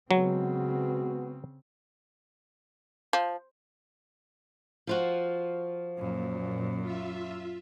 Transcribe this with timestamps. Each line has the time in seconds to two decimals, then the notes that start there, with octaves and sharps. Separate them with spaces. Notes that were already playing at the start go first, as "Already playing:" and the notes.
0.11 C#3 F#3 G#3 B3 C4 F#4
3.13 F3
4.87 F3 F4 F#4
5.98 F#2 A#2
6.81 F4 E5